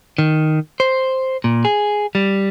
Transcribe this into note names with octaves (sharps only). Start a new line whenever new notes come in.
D#3
C5
A#2
G#4
G3